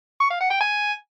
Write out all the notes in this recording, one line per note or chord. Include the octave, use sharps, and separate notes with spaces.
C#6
F5
F#5
G5
G#5